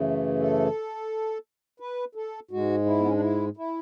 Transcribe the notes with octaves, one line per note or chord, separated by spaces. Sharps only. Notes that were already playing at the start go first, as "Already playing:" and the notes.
Already playing: F#2 C#3 E3 A3
A4
B4
A4
G#2 G#3 F#4
E4
B3
C#4
D4
E4
E4